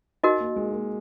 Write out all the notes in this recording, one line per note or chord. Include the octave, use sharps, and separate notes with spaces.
D#4 F#4 A#4 D#5
A#3
G#3
A#3